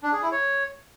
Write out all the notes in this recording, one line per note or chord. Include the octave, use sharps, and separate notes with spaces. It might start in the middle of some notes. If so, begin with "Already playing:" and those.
D4
G#4
E4
C#5